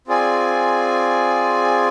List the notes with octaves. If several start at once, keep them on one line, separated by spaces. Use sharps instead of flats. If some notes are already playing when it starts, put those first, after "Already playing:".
C4 F4 G#4 D5 G#5